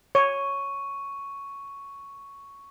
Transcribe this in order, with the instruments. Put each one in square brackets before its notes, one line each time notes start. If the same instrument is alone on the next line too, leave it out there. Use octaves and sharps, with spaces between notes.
[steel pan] C#5 [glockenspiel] C#6 D#7